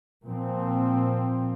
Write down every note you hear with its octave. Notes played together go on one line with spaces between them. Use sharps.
A#2 F3 C4